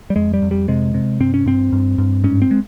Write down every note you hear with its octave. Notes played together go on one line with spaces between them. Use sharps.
G3
F2 G#3
G3
F2
G3
C3 G#3
C3
G2 C4
C#4
G2 C4
G2
G2
G#2 C#4
C4
G#3